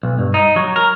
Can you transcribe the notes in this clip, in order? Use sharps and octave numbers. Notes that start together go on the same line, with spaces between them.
B1
G2
D#4
F#3
A#4